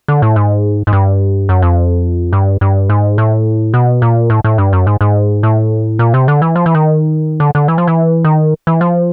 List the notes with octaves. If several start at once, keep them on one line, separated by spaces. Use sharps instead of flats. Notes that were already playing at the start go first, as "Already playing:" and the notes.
D3
A2
G#2
G#2
G2
F#2
F2
G2
G2
G#2
A2
B2
A#2
A2
A2
G2
F#2
G#2
G#2
A2
A#2
C3
D3
E3
F3
E3
D#3
D3
D3
E3
F3
E3
D#3
E3
F3